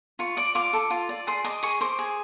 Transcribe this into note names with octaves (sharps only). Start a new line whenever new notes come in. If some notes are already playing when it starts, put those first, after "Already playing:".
F4 C#6
D5 D6
F4 D6
A4
F4
D5
G#4 C6
D#5 D6
G#4 C#6
C5 D6
G#4